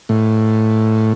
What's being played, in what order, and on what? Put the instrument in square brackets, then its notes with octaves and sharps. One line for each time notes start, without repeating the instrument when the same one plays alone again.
[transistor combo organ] A2